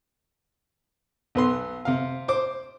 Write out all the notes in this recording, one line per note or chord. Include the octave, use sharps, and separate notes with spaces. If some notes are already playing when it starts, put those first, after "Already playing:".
B1 B3 C6
C3 F5
C5 D6